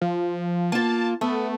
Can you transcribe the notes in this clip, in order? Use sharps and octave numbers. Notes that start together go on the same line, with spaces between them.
F3
A#3 F4 A5
A3 B3